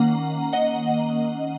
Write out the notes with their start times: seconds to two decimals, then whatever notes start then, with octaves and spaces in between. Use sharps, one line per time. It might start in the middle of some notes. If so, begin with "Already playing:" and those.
Already playing: D#3 A#3 C#4 F#5 A#5
0.53 D#5 F#5